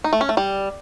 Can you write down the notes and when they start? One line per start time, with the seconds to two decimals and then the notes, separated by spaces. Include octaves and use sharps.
0.04 D#4
0.13 A3
0.21 C#4
0.29 A3
0.37 G3